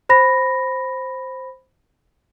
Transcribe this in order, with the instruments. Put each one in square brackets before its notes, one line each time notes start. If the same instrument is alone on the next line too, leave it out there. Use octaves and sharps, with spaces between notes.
[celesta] C5 B5 A#6